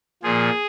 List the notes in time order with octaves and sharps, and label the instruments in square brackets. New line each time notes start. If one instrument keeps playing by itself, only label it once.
[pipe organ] A#2 F3 G#4